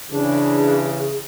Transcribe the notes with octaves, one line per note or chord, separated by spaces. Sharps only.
C#3 E3 D4 G#4